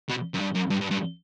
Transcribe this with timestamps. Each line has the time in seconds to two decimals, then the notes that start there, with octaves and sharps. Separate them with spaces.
0.09 B2
0.34 F#2
0.40 G2
0.55 F#2
0.70 G2
0.81 G2
0.91 G2